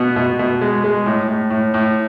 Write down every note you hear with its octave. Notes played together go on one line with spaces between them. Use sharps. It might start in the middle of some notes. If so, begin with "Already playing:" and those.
Already playing: B2 B3
B2
B2
G#3
G#3
A2
A2
A2
A2